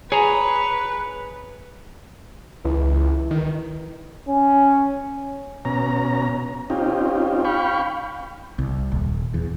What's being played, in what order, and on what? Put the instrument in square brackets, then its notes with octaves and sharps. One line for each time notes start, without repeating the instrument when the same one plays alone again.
[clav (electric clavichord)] G#4 [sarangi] B4 [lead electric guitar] C#5 A#5
[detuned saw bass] C#2 [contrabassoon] E3
[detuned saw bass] D#3
[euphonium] C#4
[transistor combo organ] B2 C#4 A#5
C4 C#4 D#4 F4 G4
F5 G5 B5 C#6
[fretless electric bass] C2
D#1
E2